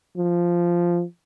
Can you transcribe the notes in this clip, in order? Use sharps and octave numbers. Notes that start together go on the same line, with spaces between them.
F3